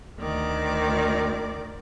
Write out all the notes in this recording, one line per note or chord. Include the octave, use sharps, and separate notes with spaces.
D2 D#3 D5